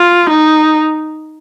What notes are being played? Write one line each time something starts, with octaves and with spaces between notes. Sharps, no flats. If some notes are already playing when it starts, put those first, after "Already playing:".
Already playing: F4
D#4